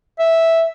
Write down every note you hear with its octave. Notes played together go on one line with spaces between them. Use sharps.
E5